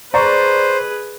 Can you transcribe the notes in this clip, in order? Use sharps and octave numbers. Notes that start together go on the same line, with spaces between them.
G#4 B4 C5 D5 A#5 C#6